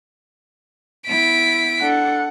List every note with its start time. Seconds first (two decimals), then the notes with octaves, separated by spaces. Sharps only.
1.08 B3 E4 B6 D7
1.81 D4 A4 F#5